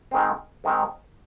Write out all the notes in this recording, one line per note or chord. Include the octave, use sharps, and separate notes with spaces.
G#2 D#3 G#3 C4
G#2 D#3 G#3 C4